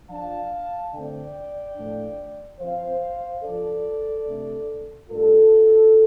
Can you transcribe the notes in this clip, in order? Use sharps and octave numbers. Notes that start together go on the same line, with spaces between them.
F3 D4 F5 A5
D3 A3 C4 D5 G5
A2 F3 D4
F3 C4 C5 F5
F3 D4 A4 D5
C3 A3 D4
A2 G3 D4 F4 A4